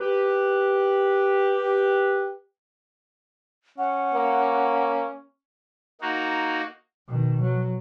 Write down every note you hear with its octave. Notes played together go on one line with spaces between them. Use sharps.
G4 B4
C#4 F#5
A#3
A#3 D#4 F#4
B2 D#3
F#3